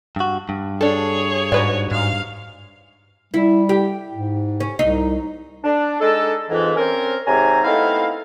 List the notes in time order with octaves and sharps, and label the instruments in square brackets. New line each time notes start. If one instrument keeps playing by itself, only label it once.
[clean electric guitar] G2 F#4
G2
[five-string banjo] D4 A4 [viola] G#4 C#5
[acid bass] G#2 [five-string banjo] F#4 B4 D5
[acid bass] G#2 [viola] F5
[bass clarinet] G3 [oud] E4
[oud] G4
[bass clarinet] G#2
[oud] C#4
[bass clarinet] C2 [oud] D#4
[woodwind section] D4
G#3 D4 D#4 A4
F2 G#2 E3
C4 C#4 A#4
G#2 C3 C#5 G#5 A#5
A3 B3 C4 D#4 E4 F5